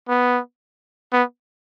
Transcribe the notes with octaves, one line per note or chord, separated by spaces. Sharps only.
B3
B3